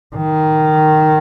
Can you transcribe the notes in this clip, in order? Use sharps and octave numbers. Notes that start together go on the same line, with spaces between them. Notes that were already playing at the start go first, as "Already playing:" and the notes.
D#3